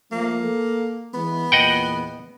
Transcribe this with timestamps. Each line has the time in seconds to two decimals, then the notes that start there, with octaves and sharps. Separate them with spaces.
0.12 F3 A3 A#3
0.44 A4
1.14 E3 G#3 B3
1.52 E2 A#2 D#5 F#5 G5